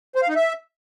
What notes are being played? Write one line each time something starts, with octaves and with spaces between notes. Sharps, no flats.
C5
F5
D#4
E5